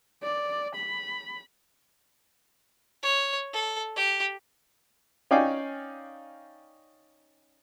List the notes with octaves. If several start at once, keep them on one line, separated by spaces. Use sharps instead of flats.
D5
B5
C#5
A4
G4
C#4 D#4 D5 F5 G5 G#5